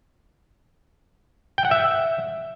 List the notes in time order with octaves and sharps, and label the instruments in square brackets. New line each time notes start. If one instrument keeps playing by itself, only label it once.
[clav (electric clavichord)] G5
F#5
E5